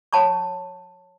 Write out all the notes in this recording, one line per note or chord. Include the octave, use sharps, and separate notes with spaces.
C#5 F#5 A5 B5 C#6